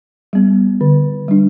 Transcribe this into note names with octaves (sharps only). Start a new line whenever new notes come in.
G3 B3
D3
G3 D4